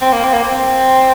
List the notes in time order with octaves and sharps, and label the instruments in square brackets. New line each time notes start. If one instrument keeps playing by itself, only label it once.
[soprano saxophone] C4
A#3
C4
A#3
C4